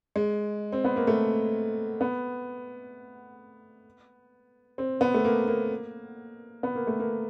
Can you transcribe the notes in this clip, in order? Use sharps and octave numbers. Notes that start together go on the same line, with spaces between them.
G#3
C4
B3
A#3
A3
B3
C4
B3
A3
A#3
A#3
B3
A#3
A3
A#3